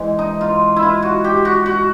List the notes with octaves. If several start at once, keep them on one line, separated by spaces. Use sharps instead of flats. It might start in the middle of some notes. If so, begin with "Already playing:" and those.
Already playing: G#2 E3
D#4
F4
E4
F4
F#4
G4
F#4
F#4